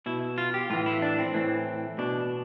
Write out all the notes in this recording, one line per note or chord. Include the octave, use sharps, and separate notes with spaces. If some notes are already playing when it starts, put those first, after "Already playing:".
B2 E4
F4
G4
A2 E3 F4
E4
D4
C4
A2 E3
B2 D4